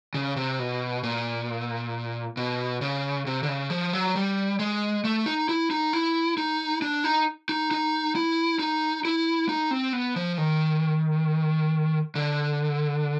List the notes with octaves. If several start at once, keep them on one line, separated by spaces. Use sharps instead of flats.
C#3
C3
B2
A#2
B2
C#3
C3
D3
C#3
F3
F#3
G3
G#3
A3
D#4
E4
D#4
E4
D#4
D4
D#4
D#4
D#4
E4
D#4
E4
D#4
C4
B3
F3
D#3
D3